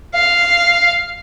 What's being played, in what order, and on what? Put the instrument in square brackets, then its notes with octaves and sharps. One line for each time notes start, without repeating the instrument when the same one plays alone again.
[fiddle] F5